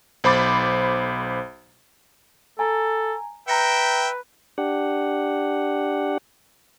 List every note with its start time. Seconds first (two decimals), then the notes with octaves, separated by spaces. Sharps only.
0.24 B1 C5 B5 D6 A6
2.59 A4 G#5 A#5
3.48 B4 E5 G5 A#5 A#6 C#7
4.58 D4 G4 F#5